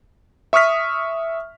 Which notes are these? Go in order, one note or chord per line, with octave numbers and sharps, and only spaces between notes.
E5 C#6 D#6 F6 B6